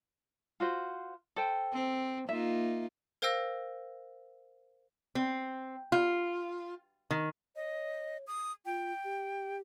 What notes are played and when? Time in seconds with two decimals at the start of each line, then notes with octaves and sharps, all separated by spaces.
0.60 F4 F#4 C5
1.36 A4 C5 G5
1.73 C4
2.29 A#3 D#4 F4 E5
3.22 A#4 C5 F5 G5 E6 A#6
5.15 C4
5.92 F4
7.11 D#3
7.56 C#5 D#5
8.27 D#6
8.66 F4 G5
9.04 G4